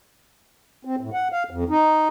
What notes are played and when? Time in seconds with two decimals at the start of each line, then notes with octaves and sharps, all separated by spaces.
0.85 C4
1.01 A2
1.13 F#5
1.32 F5
1.51 F2
1.69 D#4